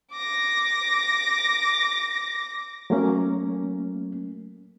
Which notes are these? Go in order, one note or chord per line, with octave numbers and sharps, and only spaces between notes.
D6 A#6
F#3 A3 A#3 C#4